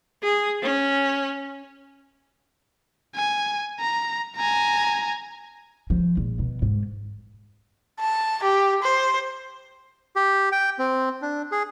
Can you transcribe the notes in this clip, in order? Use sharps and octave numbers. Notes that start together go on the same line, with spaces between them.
G#4
C#4
G#5
A#5
G#5 A#5
F3
A#1
B2
G#2
A5
G4
C5
G4
G5
C4
D4
G#4